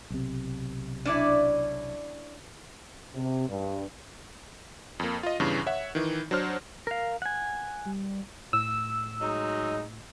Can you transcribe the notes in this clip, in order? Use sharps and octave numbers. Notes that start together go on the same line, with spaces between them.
B1 C3
C#4 D4 E4 D5
C3
G2
F2 A#3
F4 D#5
E2 G2 C#3 E3
C#5 E5 F#5
D#3 E3
F#3 D4 C5 F6
A#4 F5
F#5 G#5
G3
A2 E6
F#3 G#3 D#4